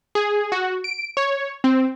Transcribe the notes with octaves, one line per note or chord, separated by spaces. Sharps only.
G#4
F#4
D7
C#5
C4